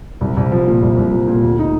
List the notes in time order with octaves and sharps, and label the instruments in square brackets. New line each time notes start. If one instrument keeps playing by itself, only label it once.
[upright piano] C2
C2
F3
A#2
C2
C2
F3
A#2
D2
D#4